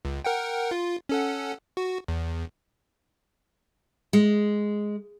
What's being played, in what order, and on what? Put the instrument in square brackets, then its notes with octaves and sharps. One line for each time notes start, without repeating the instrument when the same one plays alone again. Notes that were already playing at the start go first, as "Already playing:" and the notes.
[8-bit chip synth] C#2
A#4 F#5 G5
F4
C#4 A4 F#5
F#4
E2
[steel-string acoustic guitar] G#3